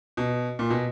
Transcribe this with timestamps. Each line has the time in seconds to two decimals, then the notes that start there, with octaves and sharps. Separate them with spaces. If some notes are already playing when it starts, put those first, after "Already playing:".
0.17 B2
0.59 A#2
0.70 B2